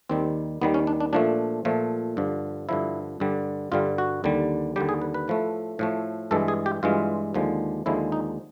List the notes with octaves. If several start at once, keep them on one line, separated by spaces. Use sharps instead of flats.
D#2 D#3 G3 C4
D#2 D#3 G3 B3
C#4
D4
D4
A#2 F3 A3 D4
A#2 F3 A3
G2 D3 F3
G2 D3 F3 E4
G2 D3 G3
G2 D3 G3 F4
F#4
D#2 D3 G3
D#2 D3 G3 G4
G#4
B4
B4
A2 F3 A3
A2 F3 A3
G2 E3 G#3 A4
G#4
G4
G2 E3 G#3 F4
D#2 D3 F3 G#3
D#2 D3 F3 G#3 E4
D#4